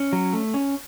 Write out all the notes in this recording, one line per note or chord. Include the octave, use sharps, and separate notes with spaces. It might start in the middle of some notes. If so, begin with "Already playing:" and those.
Already playing: C#4
F#3
A3
C#4